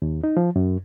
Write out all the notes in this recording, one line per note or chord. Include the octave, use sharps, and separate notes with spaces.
D#2
D#4
F3
F#2